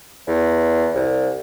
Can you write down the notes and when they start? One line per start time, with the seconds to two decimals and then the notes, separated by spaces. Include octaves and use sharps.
0.27 E2
0.94 C2